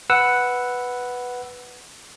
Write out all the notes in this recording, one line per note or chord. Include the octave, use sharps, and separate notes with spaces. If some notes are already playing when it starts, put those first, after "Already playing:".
B4 F#5 E6